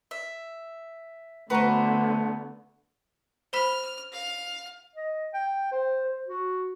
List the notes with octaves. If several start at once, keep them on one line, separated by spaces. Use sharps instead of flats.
E5
D3 A3 B3 F#4 B4 C5 F#5 A#5
C5 B5 F6 B6
F5
D#5
G5
C5
C5
F#4